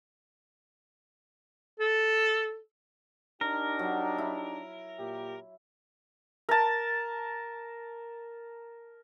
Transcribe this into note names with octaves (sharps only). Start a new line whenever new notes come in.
A4
D4 D#4 G4 A#4
F#3
E4
A#2 G4
A#4 A5